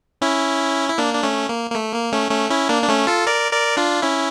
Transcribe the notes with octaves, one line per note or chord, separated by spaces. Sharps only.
C#4 E4
E4
A#3 D4
D4
A3 C#4
A#3
A#3
A3
A#3
A3 C#4
A3 C#4
C#4 E4
A#3 D4
D4
A3 C#4
F4 A4
A#4 D5
A#4 D5
D4 F4
C#4 E4